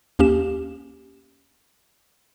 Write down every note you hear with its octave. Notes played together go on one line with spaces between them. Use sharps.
D#2 A#3 C#4 G4 E7